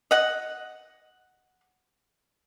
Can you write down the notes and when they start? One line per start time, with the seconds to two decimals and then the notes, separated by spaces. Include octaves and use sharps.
0.11 D#5 F#5